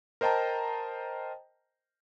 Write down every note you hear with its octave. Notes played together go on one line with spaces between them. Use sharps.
A#4 C5 D#5 G5 A5 A#5